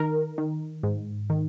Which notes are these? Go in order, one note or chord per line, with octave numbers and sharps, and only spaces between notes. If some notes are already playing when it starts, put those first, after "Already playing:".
Already playing: D#3 A#4
D#3
G#2
D#3